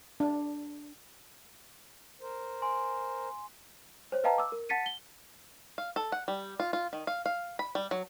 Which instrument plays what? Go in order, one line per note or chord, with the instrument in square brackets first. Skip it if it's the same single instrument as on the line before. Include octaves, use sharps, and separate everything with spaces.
[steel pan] D4
[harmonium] A#4 C5
[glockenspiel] G#5 C6
[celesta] C5 C#5
B4 D#5 F5 G5 A5 A#5
D6 E6
A#4
F#5 A5 A6 B6 C#7 D#7
G7
[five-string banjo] F5
A4
F#5
G3
F4
F4
D#3
F5
F5
B5
G3
F#3